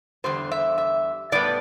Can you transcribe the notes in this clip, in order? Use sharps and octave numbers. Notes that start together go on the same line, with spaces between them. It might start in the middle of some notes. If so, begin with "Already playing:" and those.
E2 D3 G3 C5
E5
E5
A2 G3 B3 D5